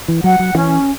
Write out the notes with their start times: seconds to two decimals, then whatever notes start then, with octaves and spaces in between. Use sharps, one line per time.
0.08 E3
0.24 F#3 F#5
0.39 F#3
0.55 E3 C#4